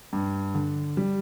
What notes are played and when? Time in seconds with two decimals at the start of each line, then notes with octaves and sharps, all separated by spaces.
0.13 G2
0.54 D3
0.97 G3